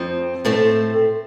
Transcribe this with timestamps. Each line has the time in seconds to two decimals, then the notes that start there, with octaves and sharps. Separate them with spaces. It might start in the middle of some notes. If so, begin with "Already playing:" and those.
Already playing: F2 F3 C4
0.45 A2 A3 C4 A4 C5